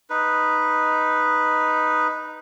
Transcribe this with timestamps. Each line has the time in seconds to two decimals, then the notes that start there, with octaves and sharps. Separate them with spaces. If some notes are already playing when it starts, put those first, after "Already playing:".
0.10 D#4 B4